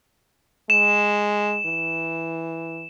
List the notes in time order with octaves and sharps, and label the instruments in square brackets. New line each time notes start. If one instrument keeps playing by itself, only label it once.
[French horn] G#3 [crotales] E7
[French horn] E3